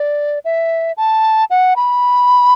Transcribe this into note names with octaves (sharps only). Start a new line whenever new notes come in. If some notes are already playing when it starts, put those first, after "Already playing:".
Already playing: D5
E5
A5
F#5
B5